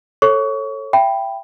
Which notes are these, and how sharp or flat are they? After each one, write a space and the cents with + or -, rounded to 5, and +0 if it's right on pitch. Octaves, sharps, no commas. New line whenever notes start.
A4 +10 C#5 -20 C#6 +30
E5 +30 G5 +0 B5 +0